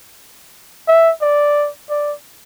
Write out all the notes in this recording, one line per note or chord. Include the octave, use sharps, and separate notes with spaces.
E5
D5
D5